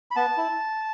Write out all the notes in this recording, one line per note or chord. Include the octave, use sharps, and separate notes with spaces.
B5
B3 A5
E4